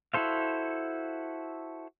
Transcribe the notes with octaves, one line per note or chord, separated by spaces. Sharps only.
E4 F#4 A4 C5 F5